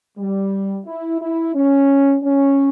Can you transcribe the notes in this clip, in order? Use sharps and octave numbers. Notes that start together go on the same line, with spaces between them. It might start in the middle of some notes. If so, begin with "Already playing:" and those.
G3
E4
E4
C#4
C#4